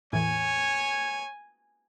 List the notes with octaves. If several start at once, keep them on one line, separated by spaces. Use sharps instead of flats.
E2 A2 C#5 G#5